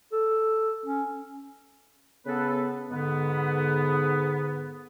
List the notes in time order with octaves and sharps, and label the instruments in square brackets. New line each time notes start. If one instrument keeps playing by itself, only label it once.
[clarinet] A4
C#4
[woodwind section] C#3 B3 A4 B4
G#2 D3 B3